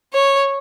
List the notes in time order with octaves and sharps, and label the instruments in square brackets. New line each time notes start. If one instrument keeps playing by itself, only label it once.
[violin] C#5